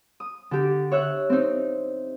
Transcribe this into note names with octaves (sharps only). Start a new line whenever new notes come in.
D#6
D3 G4
C#5 E5 F#6
C4 D#4